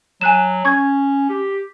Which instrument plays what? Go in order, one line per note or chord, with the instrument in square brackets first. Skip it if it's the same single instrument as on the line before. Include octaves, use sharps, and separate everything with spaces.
[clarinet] F#3 [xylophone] G#5 F#6 E7
[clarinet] C#4 [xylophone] C#6 G#6
[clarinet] G4